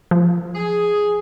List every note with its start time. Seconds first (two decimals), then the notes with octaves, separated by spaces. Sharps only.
0.11 F3
0.55 G#4